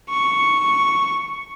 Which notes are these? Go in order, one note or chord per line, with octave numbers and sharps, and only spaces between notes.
C#6